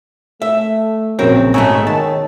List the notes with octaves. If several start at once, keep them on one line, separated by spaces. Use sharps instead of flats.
A3 E5
A#1 C#3 F#3 C4 A#4 C#5
G#2 B2 A3 G#4 C#5 E6
D#3 A5